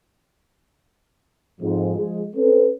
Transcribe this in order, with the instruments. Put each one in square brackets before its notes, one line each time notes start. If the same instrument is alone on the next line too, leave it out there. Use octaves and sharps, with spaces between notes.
[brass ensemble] F2 G#2 F3
F3 G#3
C4 C#4 A4 B4